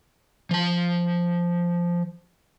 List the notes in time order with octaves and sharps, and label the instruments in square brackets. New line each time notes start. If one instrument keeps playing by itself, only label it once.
[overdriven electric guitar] F3 A5